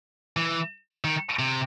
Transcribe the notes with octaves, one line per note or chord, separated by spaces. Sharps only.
E3
D#3
C3